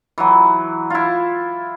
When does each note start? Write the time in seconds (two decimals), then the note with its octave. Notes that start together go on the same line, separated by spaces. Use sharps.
0.18 E3 F#3
0.90 E4 F4